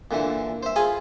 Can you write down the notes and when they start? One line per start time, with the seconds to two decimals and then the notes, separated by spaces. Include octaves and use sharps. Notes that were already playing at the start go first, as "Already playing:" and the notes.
0.11 A#2 D3 E3
0.63 C5 E5
0.76 F4 G#4 G#5 B5